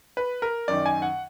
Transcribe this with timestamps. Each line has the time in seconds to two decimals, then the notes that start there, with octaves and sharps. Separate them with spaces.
0.17 B4
0.42 A#4
0.68 F#2 D#3 D5
0.86 G#5
1.02 F#5